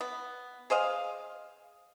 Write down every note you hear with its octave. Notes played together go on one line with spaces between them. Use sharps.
B3
G#4 C5 D#5 F5